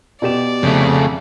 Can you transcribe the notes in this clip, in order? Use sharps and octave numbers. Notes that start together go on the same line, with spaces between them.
B2 G4 D5 E7
F2 C#3 A3